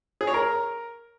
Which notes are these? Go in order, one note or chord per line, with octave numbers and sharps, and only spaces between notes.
G#4
C#5
A#4